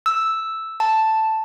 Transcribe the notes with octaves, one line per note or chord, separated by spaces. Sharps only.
E6
A5